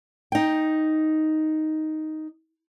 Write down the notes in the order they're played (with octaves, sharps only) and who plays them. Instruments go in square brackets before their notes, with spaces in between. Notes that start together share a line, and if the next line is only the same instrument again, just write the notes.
[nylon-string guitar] D#4 G5